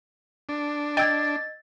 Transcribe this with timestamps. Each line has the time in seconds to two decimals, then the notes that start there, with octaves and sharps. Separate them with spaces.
0.49 D4
0.97 D#5 G5 E6 G#6 A6